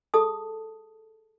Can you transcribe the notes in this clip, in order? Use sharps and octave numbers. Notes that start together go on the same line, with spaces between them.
G#4 A4 A5 D#6